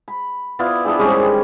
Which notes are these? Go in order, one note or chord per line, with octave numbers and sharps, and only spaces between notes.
B5
B3 E4 F4 D5
D4 E4 G4 G#4
G3 G#3 C4 C#4
D#3